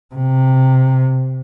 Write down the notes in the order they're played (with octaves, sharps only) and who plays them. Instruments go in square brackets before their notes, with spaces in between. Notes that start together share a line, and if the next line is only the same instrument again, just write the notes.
[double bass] C3